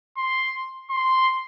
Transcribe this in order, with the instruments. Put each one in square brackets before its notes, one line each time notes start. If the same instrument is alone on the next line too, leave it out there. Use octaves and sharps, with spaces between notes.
[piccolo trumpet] C6
C6